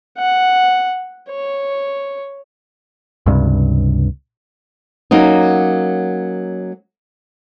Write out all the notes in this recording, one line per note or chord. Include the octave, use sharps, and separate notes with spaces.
F#5
C#5
C#2 G2 C3
F#3 A#3 C#4 D#4